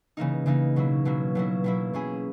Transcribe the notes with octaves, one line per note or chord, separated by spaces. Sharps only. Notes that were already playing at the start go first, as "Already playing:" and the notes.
C#3 E3 A#3 D#4
C#3 E3 A#3 D#4
B2 F#3 A#3 E4
B2 F#3 A#3 E4
B2 F#3 A#3 E4
B2 F#3 A#3 E4
B2 A#3 C#4 E4 G#4